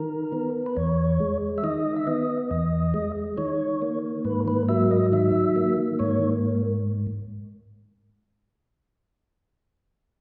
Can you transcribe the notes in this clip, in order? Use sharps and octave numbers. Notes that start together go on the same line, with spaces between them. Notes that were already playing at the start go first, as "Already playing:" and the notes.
Already playing: D#3 A#4
B3
B4
E2 C#5
G#3
E5
D#3 D#5
E5
B3 D#5
E2 D#5
G#3
D#3 C#5
A#3
G#2 B4
B4
F#3 E5
D#5
D#3 E5
A#3
G#2 C#5